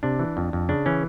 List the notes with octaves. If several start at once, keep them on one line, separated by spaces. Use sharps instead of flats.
C3 D4
E3
F2
F2
C#3 D4
E3 C#4